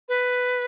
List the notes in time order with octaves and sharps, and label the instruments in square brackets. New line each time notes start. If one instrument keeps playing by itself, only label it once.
[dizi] B4